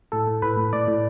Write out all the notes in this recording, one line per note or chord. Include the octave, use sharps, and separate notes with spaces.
A2 A4
A2
A2 B4
A2
A2 D5
A2